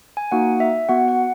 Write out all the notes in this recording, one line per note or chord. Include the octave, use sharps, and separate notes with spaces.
G#5
A#3 D#4 F#4 F#5
E5
B3 F#4 F#5
F#5